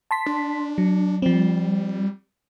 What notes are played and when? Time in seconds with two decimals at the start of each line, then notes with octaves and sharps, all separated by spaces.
0.11 A5 C6 B6
0.26 D4
0.78 F#3
1.22 F3 G3 C4